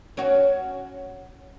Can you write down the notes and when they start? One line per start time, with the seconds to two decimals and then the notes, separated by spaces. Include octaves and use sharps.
0.17 C#4 F#4